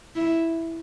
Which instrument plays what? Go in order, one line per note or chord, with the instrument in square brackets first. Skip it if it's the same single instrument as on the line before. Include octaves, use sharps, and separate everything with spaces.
[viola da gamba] E4